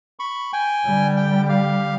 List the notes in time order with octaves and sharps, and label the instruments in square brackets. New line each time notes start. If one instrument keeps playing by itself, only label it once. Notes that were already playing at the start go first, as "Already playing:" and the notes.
[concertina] B5 C#6
G5 G#5
[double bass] D3 G3
[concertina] G5
G4 F5